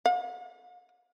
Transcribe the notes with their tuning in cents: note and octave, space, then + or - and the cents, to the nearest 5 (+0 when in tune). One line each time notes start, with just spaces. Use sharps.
F#5 -45